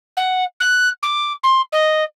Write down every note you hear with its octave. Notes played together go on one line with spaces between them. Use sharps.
F#5
F#6
D6
C6
D#5